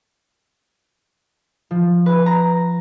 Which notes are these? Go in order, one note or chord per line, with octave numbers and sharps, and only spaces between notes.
F3
B4
A#5